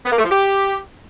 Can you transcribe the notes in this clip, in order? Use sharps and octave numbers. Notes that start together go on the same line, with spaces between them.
B3
A#3
A3
F3
G4